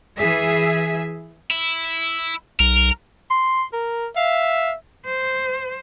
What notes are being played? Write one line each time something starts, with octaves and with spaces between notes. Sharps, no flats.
E3 G#4 E5
E4
B1 A#4
C6
A#4
E5 F5
C5